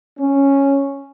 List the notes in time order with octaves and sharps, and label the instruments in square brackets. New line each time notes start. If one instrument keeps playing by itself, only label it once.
[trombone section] C#4